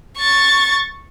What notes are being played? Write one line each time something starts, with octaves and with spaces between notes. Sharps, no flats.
C#6 A6